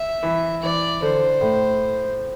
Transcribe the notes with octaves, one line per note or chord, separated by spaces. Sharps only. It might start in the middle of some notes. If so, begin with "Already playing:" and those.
Already playing: E5
E3
E3 D5
D3 C5
A2